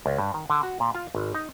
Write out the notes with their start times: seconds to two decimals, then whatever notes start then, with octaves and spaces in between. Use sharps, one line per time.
0.06 C#2
0.18 G2
0.34 D#3
0.50 D3
0.63 F#4
0.80 A#2
0.95 F4
1.15 G#1
1.35 D#4